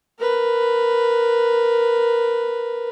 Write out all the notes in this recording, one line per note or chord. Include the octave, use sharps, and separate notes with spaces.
A#4 B4